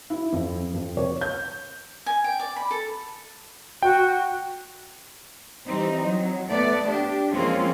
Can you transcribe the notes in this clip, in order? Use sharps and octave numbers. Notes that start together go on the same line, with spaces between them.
E4
F2
F2
C#5
G6
G#5
G5
D5
B5
A4
F#4 G5
E3 G3 C4 D#4
F#3
A3 B3 D5
D4 G4
F3 G#3 A#3 C4 C#4 F4